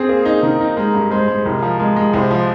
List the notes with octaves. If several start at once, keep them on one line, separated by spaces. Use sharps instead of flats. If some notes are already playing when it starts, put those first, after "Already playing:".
Already playing: C4 G#4
A#3
D#4
D#3 A#4
D#4
G#3 A#4
G2
G#3 C5
G#3
C2 A#4
F3
G#3 A#4
G#3
C2 C5
F3